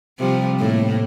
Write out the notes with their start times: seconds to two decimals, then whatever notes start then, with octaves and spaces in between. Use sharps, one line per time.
0.19 C3 F3 G3
0.59 A2 A#3